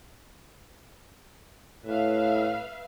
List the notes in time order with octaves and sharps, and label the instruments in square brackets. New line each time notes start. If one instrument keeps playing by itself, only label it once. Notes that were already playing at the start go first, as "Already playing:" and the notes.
[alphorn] A2 [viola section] B4 E5 F5